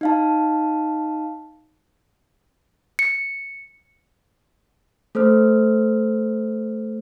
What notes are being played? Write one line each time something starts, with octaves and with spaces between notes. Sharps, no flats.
D#4 F5 A5
C#7
A3 A4 C5 F6